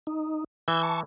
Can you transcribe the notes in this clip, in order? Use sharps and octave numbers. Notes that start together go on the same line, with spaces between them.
D#4
E3 E6 G6 G#6
A5 C#6